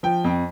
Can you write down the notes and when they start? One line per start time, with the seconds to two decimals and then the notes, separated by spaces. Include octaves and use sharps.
0.03 F3 G5
0.24 F2